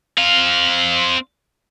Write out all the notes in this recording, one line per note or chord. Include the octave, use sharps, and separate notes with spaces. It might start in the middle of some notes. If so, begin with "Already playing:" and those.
C4 F5